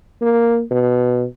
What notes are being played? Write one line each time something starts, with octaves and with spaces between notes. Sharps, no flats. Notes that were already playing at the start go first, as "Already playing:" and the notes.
A#3
B2